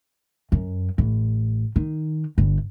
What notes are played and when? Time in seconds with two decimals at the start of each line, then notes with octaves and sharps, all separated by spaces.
0.52 F#2
0.98 A1
1.76 D#3
2.38 G1